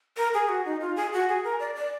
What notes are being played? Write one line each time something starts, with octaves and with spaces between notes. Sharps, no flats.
A#4
G#4
F#4
D#4
F4
G#4
F#4
G#4
A#4
D5
D5